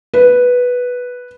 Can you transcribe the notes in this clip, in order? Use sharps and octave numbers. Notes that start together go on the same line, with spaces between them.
B4